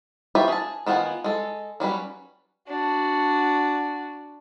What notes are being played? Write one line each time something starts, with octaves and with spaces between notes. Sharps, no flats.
F4 G4 B4 C#5 E5
G#4 A5
D#3 B3 F4 F#5 G#5
G#3 A4
F#3 G3 C#4 B4
D4 F#4